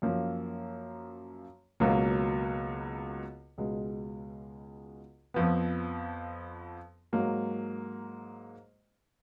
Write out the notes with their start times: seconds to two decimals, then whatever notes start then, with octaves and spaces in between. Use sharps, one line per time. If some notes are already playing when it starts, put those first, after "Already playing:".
0.02 F#2 F3 A#3
1.80 C#2 B2 F#3 A#3
3.58 C#2 B2 G#3
5.34 F2 F3 B3
7.13 G#2 F#3 A#3